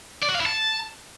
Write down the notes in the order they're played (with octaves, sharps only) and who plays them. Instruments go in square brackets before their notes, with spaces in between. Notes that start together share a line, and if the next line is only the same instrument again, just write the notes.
[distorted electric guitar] D5
F#4
F5
E4
A5